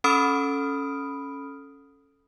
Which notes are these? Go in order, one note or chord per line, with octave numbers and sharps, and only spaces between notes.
C#4 A4 B5 D#6 F6 D7